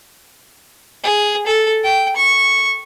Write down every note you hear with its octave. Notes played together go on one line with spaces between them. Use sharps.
G#4
A4
G5
C#6